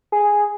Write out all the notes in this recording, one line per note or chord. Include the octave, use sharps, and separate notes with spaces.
G#4